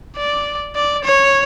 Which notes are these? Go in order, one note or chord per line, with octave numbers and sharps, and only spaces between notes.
D5
D5
C#5